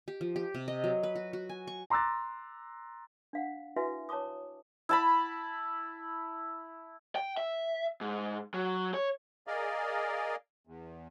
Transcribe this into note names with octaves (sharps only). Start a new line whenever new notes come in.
G4
F3
G4
C3
D#5
F#3
B4
F#4
F#4
G#5
C#6
A#5 C6 D6 E6 F#6 A6
D4 F5 F#5
E4 F#4 B4 E5 G#5
C#5 A5 A#5 D6 D#6
E4 A5 B5
G5
E5
G#2
F#3
C#5
G#4 A#4 D5 D#5 F5
E2